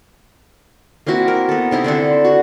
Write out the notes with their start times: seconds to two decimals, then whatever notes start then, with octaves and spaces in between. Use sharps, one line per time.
1.07 A#3 C4 E4 F#4
1.28 A#4
1.49 B3 A4
1.71 C3 D#4 E4
1.84 D3 C4 D4 A4
2.24 F#4